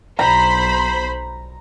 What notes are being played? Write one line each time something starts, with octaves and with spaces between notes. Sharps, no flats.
B1 C5 A#5 B5